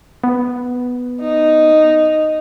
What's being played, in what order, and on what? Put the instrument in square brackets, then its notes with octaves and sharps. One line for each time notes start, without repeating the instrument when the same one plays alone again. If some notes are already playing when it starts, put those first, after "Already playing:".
[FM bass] B3
[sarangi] D#4